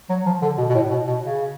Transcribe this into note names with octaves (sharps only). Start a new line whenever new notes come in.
F#3
F3
D3
B2
B2
A2
B2
B2
C#3